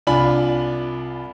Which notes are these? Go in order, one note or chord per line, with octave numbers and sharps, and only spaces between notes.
C2 D4 F4 G#5 B5 F#7